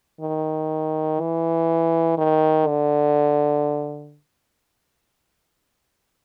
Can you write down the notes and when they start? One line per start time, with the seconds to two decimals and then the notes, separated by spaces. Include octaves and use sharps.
0.21 D#3
1.20 E3
2.18 D#3
2.67 D3